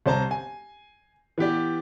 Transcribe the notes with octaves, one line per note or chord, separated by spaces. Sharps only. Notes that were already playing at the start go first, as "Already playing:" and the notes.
C2 C5 A5 A#5
G#5
E3 B3 G4 D5